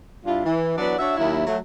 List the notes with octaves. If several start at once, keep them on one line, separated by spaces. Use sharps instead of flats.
G2 D4 E4 F4
E3
E3 F#3 B3 D4 F#4 D5
D4 F#4 C#5 E5
D#2 F#3 E4
F#3 A3